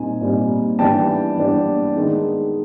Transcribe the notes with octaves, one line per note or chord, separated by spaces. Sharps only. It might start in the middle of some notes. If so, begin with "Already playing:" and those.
Already playing: A#2 G3 C4 D#4 G#5
A#2 G3 C4 D#4
E3 G3 B3 D4 G5 A5
E3 G3 B3 D4
D#3 G#3 B3 D#4